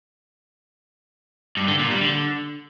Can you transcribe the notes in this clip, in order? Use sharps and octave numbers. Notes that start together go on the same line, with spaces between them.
G2
D3
A#2
G3
D3